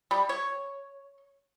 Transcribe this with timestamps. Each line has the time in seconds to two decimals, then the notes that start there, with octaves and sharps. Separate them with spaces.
0.11 G3
0.29 C#5